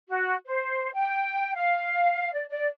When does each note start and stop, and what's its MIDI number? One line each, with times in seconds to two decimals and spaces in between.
0.08 0.34 66
0.46 0.91 72
0.94 1.54 79
1.55 2.33 77
2.33 2.44 74
2.49 2.67 74